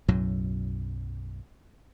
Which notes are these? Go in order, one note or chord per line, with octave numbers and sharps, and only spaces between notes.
B1 F#2 A2 F#3